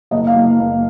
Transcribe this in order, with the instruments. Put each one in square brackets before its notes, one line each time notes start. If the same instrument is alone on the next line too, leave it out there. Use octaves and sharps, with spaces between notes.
[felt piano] F#1 D#5
F5
F#1
F#1